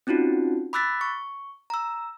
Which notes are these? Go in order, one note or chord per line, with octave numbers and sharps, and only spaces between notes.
C4 C#4 D#4 F4 F#4
B5 D6 E6 F#6 A6 B6
C#6
A#5 E6